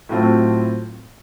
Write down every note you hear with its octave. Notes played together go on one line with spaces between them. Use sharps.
A2 F#3 A3 C4 F4